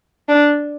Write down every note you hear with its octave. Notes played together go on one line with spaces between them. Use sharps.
D4